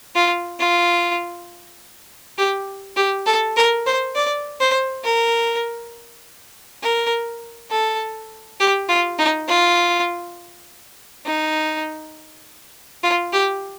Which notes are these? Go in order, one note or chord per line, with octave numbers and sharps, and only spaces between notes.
F4
F4
G4
G4
A4
A#4
C5
D5
C5
A#4
A#4
A4
G4
F4
D#4
F4
D#4
F4
G4